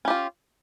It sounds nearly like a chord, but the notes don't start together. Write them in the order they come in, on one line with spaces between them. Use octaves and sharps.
C#4 G4 F4